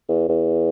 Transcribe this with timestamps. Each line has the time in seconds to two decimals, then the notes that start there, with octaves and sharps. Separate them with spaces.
0.09 E2
0.29 E2